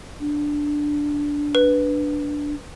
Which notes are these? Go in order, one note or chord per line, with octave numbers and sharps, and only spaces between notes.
D4
B4